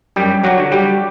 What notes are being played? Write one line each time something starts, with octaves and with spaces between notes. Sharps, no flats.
F#2 G3 G4
F#3 F#4
D3 F#3
G3 G4